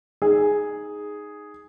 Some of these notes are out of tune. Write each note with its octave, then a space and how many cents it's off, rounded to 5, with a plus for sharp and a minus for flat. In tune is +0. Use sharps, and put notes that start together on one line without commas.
D#4 -5 G#4 +0